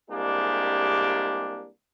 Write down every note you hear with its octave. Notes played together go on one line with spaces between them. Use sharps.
C2 G#3 A#3 D4 G4 G#4